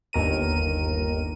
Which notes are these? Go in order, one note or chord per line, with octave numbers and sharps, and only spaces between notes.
G1 D#2 A#4 D#7